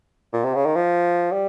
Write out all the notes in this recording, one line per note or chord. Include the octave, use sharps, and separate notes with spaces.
A#2
C3
C#3
D#3
F3
G3